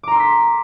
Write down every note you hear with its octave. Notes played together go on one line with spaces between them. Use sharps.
A#5 C6 D6 E6 B6